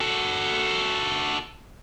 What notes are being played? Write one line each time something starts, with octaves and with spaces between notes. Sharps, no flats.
F#4 A4